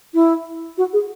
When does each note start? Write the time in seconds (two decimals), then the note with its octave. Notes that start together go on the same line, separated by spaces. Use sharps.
0.14 E4
0.78 F#4
0.93 G#4